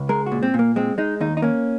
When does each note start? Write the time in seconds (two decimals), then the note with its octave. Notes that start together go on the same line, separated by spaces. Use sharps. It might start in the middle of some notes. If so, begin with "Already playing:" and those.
Already playing: C#2
0.09 G#3 A#4
0.26 F#4
0.32 A#2
0.43 C4
0.54 A#2
0.59 A#3
0.76 G#3 C4
0.98 G#3 D#4
1.21 D#2 D#4
1.37 D#4
1.42 A#3 C#4